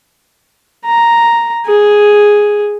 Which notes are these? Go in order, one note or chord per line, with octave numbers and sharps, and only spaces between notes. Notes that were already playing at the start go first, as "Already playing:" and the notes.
A#5
G#4